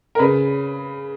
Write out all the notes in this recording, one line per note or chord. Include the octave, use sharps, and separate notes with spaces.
A#4
C#3 B4